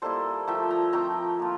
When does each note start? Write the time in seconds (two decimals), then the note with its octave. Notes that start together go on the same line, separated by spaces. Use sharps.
0.02 G3 A#3 E4 A4 C5
0.47 F3 A3 E4 E5 G5
0.70 G5 A#5
0.93 F3 A3 C4 E4 G5 A#5
1.39 A#3 F4